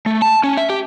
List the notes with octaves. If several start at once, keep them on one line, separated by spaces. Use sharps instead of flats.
A3
A5
C#4
E5
G4